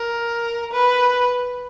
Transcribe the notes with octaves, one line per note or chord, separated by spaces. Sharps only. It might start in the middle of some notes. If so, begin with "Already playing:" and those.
Already playing: A#4
B4